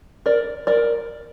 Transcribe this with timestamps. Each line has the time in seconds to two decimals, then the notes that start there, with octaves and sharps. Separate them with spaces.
0.26 A#4 D5
0.67 A#4 D5